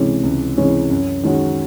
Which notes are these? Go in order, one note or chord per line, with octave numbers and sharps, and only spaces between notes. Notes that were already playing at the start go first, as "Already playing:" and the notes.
Already playing: C#2 C3 E3 G#3 C#4
C#2
C3 E3 G#3 C#4
F#2
D#3 G#3 C#4 F#4